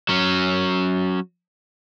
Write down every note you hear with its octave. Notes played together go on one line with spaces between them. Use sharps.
F#3 C#4